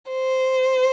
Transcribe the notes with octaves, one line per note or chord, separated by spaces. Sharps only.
C5